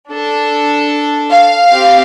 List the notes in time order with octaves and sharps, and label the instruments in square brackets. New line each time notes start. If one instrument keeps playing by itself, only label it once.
[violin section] D4 A4
F5
C4 G4